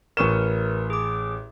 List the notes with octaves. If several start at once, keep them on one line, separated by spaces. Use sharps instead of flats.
A1 A#4 B4 C#6 E7
G#4 D6